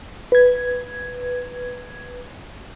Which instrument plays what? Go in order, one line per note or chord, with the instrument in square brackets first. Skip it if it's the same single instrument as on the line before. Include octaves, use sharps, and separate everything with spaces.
[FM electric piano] B4 G#6